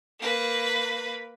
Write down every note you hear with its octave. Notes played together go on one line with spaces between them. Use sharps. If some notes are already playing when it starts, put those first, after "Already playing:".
A#3 B4